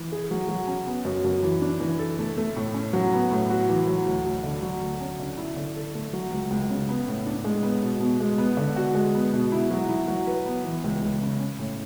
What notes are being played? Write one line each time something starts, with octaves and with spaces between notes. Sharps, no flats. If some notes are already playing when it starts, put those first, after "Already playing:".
Already playing: E3
G#4
F#3
F#3
C#4
B3
F#2
F#2
E3
D4
E3
A4
A3
A3
A2
C#4
F#3
B3
A2
F#4
E3
F#3
D2
D2
D3
F#3
D2
C#4
D3
E4
D3
A4
A3
F#3
C#2
C#2
C#3
B3
A2
D4
G#3
B3
B2
B2
G#3
B3
D3
F#4
G#3
B3
B2
E4
F#3
E4
F#3
B4
B3
E3
C#2
C#2
C#3
C#4
A2